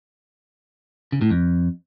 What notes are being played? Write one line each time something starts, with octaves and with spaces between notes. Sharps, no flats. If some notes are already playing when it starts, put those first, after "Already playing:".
C#3
A2
F2